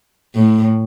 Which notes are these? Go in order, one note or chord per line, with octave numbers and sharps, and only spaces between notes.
A2